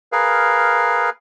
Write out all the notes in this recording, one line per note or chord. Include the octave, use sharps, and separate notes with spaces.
G#4 A#4 B4 F5